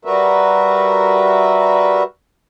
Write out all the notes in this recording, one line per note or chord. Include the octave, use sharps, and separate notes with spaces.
G3 F#4 A#4 B4 E5